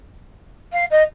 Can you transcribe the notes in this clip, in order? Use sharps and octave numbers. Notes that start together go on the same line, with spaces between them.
F5
D#5